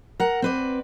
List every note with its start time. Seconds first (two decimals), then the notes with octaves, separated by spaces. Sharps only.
0.20 A#4 F#5
0.42 C4 B4 D5